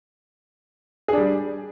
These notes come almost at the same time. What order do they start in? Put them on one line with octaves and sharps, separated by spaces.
G#4 D4 G3